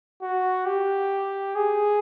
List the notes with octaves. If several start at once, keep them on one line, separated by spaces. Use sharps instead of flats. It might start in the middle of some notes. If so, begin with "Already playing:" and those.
F#4
G4
G#4